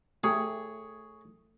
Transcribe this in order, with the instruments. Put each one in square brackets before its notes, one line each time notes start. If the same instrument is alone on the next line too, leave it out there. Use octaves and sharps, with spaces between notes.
[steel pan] A3 G4 [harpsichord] G#4 C#5